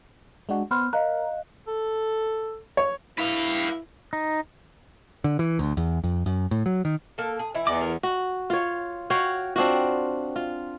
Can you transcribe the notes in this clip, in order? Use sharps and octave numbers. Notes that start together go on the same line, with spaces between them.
G#3 D4 F#4
B3 C5 B5 F6 F#6
A#4 D#5 F5 F#6
A4
C#5
E4 B4 F5
D#4
D3
E3
D2
E2
F2
F#2
A2
F#3
D#3
A#3 A4
G#4
E3 E4
E2 D5 D#5 D6
A4 A#4
F#4
F4 C#5
F#4 C#5 F5 G5
C4 D4 F4 F#4
F4